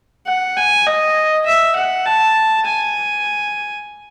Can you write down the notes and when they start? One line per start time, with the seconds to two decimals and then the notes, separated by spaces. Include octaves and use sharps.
0.27 F#5
0.57 G#5
0.86 D#5
1.46 E5
1.76 F#5
2.06 A5
2.66 G#5